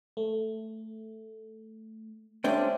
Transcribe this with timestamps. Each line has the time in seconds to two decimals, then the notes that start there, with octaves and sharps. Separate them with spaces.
0.17 A3
2.44 G#3 C#4 D4 C5 D5 E5 G5